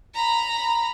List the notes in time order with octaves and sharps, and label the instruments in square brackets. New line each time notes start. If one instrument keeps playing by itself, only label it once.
[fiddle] A#5 B5